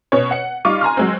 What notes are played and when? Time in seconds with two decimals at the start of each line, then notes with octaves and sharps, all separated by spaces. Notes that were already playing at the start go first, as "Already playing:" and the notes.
0.12 B2 C#4 C#5
0.31 F#5 C#7
0.65 G3 D#4 F4 C#6 D6
0.81 G#5 A#5 C6 F6
0.97 F#3 G#3 C4